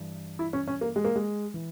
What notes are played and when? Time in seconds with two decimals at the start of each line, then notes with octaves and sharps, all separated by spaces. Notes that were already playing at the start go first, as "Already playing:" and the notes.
Already playing: G2 E3
0.39 E4
0.53 C#4
0.68 C#4
0.81 A#3
0.96 G#3
1.05 A#3
1.16 G#3
1.54 E3